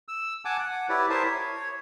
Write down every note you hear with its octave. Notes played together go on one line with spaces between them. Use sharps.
E6
F#5 G#5 A5 D6
F#5
E4 G4 B4 C#5 D5
E4 A#4 C5 E5 A5 D#6
C#5